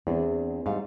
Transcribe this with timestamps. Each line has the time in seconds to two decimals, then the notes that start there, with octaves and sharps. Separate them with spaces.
0.07 E2 C4 D4 G#4
0.66 G#2 G3 A3 F5